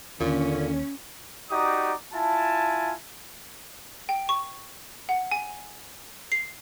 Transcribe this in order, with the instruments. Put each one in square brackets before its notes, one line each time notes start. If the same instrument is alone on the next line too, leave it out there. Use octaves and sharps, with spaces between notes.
[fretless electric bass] D#2 [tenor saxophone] A#2 [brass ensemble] D3 [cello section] C#4
[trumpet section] D#4 F#4 G4 D5 A#5 D#6
E4 F4 G#5 A5
[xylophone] G5
C#6
F#5
G#5
C7